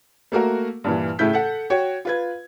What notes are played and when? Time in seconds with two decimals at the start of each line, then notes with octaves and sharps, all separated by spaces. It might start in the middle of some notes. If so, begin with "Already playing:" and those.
0.32 A3 A#3 F#4 A#4
0.84 G2 A#2 E3
1.19 A2 C#3 A3 E4 G6 B6
1.33 A4 F#5
1.70 F#4 C#5 G5
2.05 F4 B4 G#6